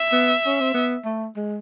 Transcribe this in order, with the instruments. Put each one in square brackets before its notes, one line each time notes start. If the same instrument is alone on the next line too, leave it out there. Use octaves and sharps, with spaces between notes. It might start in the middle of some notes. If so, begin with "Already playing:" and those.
Already playing: [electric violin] E5
[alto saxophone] B3
C#4
C4
B3
A3
G#3